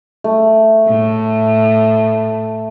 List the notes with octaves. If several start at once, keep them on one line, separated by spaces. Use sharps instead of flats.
A3
A2